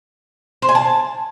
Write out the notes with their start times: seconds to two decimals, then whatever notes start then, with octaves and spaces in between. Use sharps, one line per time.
0.62 C5
0.69 G#5
0.75 A5